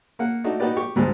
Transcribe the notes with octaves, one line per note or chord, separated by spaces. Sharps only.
A#3 F#5
A3 D4 D#4 F#4
D#4 F#4 G4 B4 D5
G4 C#6
D2 G#2 G3